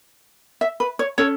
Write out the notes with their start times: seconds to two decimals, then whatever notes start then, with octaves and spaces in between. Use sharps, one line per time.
0.61 E5
0.80 B4
0.99 C#5
1.18 C#4 A4 C#5